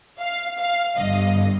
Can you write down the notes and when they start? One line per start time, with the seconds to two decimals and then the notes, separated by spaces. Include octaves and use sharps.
0.19 F5
0.58 F5
0.97 G1 G2 D3 D#5